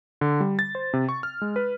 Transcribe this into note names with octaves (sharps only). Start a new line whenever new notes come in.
D3
G3
A6
C5
C3
C#6
F6
G#3
B4